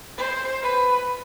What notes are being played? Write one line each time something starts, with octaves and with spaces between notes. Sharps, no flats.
C5
B4